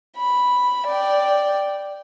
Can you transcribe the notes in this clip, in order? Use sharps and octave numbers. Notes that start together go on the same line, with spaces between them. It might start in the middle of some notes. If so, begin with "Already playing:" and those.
B5
D5 G5